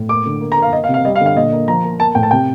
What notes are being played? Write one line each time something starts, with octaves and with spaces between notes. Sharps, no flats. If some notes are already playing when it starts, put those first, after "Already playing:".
Already playing: A2
A#3 D6
D3
A#3
A#5
A#3
F5
A#3 D#5
F5
C3
F5
G3 D#5
F5
D3
F5
A#2 D#5
A#3
F3 A#5
A#3
A#3 A5
A2 G5
A5
C3 G5